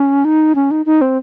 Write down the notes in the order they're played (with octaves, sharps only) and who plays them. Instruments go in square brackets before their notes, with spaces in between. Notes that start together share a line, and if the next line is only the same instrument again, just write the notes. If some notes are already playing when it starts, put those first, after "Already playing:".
Already playing: [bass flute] C#4
D#4
C#4
D#4
D#4
C4